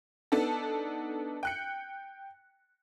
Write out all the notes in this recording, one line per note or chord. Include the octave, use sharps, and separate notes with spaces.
B3 D4 D#4 A4
G5 F#6 C#7